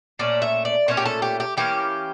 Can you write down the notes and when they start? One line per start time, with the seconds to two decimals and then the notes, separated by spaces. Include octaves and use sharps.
0.19 A#2 A3 C#4 D5
0.42 E5
0.65 D5
0.88 A#2 A3 C#4 C#5
0.97 G4
1.05 A4
1.22 G4
1.40 G4
1.57 E3 A#3 C#4 G4